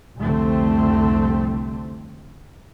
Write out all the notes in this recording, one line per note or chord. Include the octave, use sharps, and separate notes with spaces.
C2 F2 D3 A3 C4